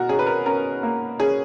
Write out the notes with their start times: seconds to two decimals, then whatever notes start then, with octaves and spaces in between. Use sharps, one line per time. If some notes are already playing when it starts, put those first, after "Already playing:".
Already playing: B2 F#4 A#4
0.09 C#4 G#4
0.19 B4
0.27 A#4
0.46 C#4 A#4
0.83 A#3
1.20 C#4 G#4